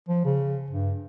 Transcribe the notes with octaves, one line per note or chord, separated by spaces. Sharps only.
F3
C#3
G2